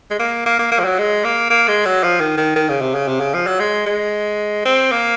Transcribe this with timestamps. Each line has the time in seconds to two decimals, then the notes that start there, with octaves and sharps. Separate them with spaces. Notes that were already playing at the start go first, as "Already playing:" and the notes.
0.10 G#3
0.19 A#3
0.46 A#3
0.59 A#3
0.72 A#3
0.80 F3
0.85 F#3
0.98 G#3
1.24 A#3
1.50 A#3
1.68 G#3
1.85 F#3
2.03 F3
2.20 D#3
2.37 D#3
2.56 D#3
2.69 C#3
2.81 C3
2.94 C#3
3.08 C3
3.20 C#3
3.34 F3
3.47 F#3
3.60 G#3
3.86 G#3
4.65 C4
4.92 A#3